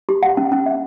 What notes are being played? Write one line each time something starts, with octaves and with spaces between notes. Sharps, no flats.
G4
F#5
C#4
C#4
E5